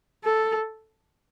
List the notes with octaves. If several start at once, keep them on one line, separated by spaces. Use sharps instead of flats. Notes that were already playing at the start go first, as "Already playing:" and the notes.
A4